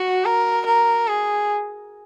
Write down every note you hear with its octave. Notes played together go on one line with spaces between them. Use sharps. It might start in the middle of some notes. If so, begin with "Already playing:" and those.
Already playing: F#4
A#4
A#4
G#4